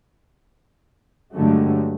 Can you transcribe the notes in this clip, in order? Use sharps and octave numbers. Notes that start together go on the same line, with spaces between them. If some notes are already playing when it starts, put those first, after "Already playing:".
G2 D3 F#3 G#3 A3